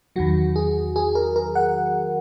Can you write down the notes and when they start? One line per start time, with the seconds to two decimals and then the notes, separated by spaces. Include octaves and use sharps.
0.16 E2 D#3 F#3 F#4
0.56 G#4
0.96 G#4
1.15 A#4
1.36 A#4
1.55 F#5